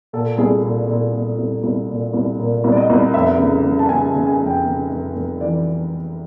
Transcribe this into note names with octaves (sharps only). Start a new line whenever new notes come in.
A#2 A4
C2 G#4
A#2 G#4
A#2 A4
A#2
C2
C2
A#2
C2
A#2 A#4
C2
D5
D#5
C2
F1 E5
C#3
C#3
A5
C#3 G#5
A5
C#3
G#5
F1
G5
C#3
F1
F1
E3 D5